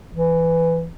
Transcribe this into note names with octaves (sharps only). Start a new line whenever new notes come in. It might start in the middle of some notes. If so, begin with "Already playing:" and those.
E3